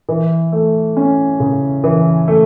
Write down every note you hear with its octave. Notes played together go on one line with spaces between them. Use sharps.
E3
A3
C#4
C#3
E3
A3